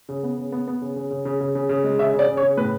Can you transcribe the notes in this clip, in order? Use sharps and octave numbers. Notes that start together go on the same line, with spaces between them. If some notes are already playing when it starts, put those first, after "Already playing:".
C#3
B3
C#3
B3
B3
C#3
C#3
C#3
C#3
C#3
C#3
C#3
G#3
C#3 E5
C#3
D5
C#3
C#5
C#3
A2 B4